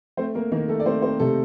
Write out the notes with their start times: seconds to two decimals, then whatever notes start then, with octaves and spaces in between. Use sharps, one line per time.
0.17 A3 C4 C5
0.35 A#3 A#4
0.52 D#3 A#3 A#4
0.68 A3 A4
0.80 D5
0.86 A3 C4 C5
1.02 C4 C5
1.20 C3 A3 A4